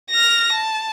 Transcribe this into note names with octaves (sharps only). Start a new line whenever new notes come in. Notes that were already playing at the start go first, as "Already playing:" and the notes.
F6 A#6
A5